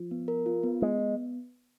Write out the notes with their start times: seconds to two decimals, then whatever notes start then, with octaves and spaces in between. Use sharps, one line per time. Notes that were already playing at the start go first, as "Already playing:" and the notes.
Already playing: F3
0.11 B3
0.28 A#4
0.46 F4
0.63 B3
0.81 G#3 B3
0.99 B3